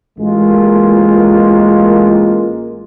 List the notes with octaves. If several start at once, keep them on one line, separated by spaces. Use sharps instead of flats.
A1 G#3 A#3 F4 A#4